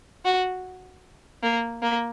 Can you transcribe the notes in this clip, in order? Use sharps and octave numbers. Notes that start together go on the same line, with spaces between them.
F#4
A#3
A#3